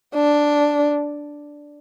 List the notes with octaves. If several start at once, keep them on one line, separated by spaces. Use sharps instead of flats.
D4